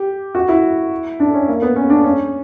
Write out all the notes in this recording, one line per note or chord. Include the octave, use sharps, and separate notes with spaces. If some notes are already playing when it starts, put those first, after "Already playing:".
Already playing: G4
F#4
E4
D4
C#4
A#3
B3
C#4
D4
C#4